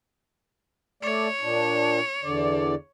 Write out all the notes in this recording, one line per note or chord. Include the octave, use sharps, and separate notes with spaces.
A3 C#5 D5
A#2 D4
E2 D3 D5